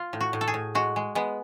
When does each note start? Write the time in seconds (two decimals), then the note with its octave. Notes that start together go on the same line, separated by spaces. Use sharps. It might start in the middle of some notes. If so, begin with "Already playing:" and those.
Already playing: F4
0.13 A2
0.21 F#4
0.33 A2
0.41 A4
0.48 G#4
0.54 A2
0.75 G#3 F#4
0.96 G#3
1.15 G#3 B3